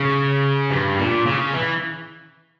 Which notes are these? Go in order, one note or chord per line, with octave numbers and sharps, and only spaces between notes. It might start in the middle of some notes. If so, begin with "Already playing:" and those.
Already playing: C#3
G2
A#2
C#3
E3